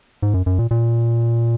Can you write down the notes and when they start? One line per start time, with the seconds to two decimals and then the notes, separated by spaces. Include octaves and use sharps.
0.22 G#2
0.34 F#2
0.46 F#2
0.59 A#2
0.71 A#2